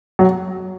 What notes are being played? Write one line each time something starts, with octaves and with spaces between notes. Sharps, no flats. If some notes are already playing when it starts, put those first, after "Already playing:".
F#3